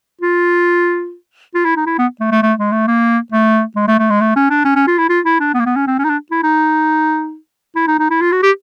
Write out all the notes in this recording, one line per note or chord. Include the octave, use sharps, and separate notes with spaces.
F4
F4
E4
D#4
E4
B3
A3
A3
A3
G#3
A3
A#3
A3
G#3
A3
A3
G#3
A3
C#4
D4
C#4
C#4
F4
E4
F4
E4
D4
B3
A#3
B3
C#4
C4
C#4
D#4
D4
E4
D#4
E4
D#4
D#4
E4
F4
F#4
G4